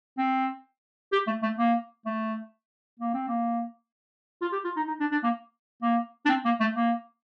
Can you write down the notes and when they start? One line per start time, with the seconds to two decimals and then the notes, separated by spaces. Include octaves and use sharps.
0.18 C4
1.12 G4
1.27 A3
1.43 A3
1.59 A#3
2.06 A3
3.00 A#3
3.14 C4
3.28 A#3
4.42 F4
4.52 G4
4.64 F4
4.77 D#4
4.88 D#4
5.00 D4
5.12 D4
5.23 A#3
5.82 A#3
6.25 D4
6.29 C4
6.45 A#3
6.60 A3
6.76 A#3